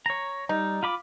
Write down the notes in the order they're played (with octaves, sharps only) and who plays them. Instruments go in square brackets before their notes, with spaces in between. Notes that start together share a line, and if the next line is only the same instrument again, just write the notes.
[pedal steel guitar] C#5 A#5
[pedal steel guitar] G3 [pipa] D#4
[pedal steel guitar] F4 B5 D6